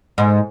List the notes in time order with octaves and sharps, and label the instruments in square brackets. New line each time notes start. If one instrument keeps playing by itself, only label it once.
[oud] G#2